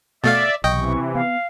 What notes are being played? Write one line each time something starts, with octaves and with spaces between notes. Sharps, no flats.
B2 A3 D5 E5 F5 A6
B1 C3 E3 D#5 G5 C#6
B3 F5